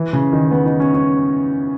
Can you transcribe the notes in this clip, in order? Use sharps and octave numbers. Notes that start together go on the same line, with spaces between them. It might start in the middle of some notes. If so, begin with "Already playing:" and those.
Already playing: E3
C#3
D#3
B3
D#4
C#4
C#4